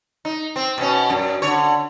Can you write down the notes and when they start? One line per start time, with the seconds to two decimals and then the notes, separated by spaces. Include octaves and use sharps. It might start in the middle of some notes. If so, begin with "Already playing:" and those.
0.25 D#4
0.56 C4
0.78 B2 C#4
1.10 F#2
1.42 D3 C#5